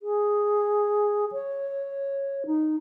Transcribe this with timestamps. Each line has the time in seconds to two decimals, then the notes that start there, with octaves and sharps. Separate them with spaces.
0.01 G#4
1.32 C#5
2.46 D#4